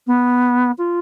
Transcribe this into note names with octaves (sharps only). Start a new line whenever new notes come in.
B3
F4